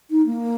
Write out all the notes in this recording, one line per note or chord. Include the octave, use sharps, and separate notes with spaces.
D#4
A#3